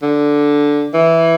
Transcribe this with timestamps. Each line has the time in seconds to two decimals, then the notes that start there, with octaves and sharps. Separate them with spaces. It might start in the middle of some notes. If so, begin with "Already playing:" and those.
0.03 D3
0.94 E3